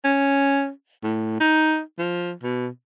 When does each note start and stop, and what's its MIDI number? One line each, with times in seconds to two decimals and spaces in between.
0.05 0.69 61
1.04 1.39 45
1.40 1.81 63
1.99 2.32 53
2.43 2.68 47